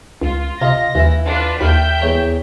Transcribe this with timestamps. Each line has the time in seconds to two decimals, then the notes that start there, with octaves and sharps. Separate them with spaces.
0.21 C#2 F4
0.61 C3 D#4 F4 A#6
0.95 D#2 E3 E4
1.26 D4 F4 B4
1.61 D#2 A#4 E5 G5 B5 G6
2.00 E2 C#5 A#5